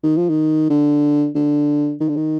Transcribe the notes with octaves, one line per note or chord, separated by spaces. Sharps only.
D#3
F3
D#3
D3
D3
D#3
D3
D#3